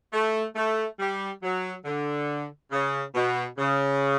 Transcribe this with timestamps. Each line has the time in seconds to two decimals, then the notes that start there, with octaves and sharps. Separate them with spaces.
0.13 A3
0.56 A3
0.99 G3
1.43 F#3
1.85 D3
2.72 C#3
3.15 B2
3.58 C#3